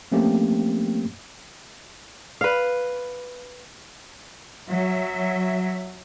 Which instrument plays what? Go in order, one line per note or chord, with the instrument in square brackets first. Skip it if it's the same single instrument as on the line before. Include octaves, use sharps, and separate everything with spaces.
[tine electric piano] F3 A3 A#3 C4 C#4 G4
[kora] B4 F5
[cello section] F#3 E5